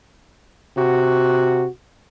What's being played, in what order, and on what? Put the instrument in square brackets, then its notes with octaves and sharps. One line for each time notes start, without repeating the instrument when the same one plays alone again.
[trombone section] C3 F#4